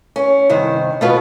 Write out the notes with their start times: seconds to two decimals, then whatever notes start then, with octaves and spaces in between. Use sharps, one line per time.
0.16 C#4
0.49 G2 C3 D#3 C5
1.01 B2 A3 B3 F4 F#4